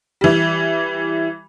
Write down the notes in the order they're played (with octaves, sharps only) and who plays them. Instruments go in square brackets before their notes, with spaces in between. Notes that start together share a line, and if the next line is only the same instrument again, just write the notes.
[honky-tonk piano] E3 G3